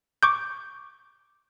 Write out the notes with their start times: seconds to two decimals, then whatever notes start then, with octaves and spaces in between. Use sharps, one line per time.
0.23 C#6 D6 G6